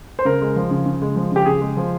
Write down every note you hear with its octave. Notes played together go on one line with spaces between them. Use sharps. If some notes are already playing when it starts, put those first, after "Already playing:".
C5
C#3 A#4
G#3
F3
C#3
C#3
G#3
F3
C#3 G4
C#3 G#4
G#3
F3